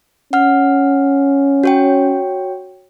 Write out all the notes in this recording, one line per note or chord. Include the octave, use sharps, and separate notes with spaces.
C#4 F#5 F6
F#4 C#5 G5